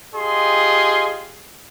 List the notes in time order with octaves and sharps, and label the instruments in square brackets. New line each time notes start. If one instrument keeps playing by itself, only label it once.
[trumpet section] F4 G4 G#4 D#5 C6